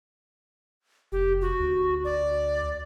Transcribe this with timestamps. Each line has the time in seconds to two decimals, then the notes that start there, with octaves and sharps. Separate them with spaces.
1.12 F1 G4
1.41 F#4
1.60 D2
2.04 D5